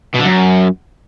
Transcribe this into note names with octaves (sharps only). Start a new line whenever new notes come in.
B2
D3
F#2